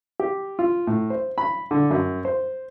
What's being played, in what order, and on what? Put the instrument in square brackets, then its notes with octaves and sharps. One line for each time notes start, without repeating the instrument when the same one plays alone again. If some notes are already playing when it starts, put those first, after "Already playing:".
[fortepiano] G4
F4
A2
C5
B5
D3
F#2
C5